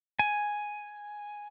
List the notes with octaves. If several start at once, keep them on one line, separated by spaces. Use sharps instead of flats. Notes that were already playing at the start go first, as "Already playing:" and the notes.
G#5